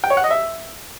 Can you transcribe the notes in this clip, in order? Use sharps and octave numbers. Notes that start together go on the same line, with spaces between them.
G5
C#5
F#5
D#5
E5